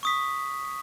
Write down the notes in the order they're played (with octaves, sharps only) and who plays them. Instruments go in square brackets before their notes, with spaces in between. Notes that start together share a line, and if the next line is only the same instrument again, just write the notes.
[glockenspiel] C#6 D#6 B6